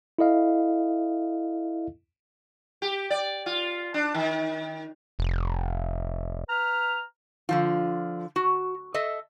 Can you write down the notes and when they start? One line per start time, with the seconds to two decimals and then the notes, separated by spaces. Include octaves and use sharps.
0.19 E4 A4 D#5 F5
2.82 G4
3.10 D5
3.46 F4
3.94 D4
4.14 D#3
5.19 F1
6.50 B4 A#5 F6
7.49 D3 F3 F4
8.36 F#4
8.94 A4 D#5 E5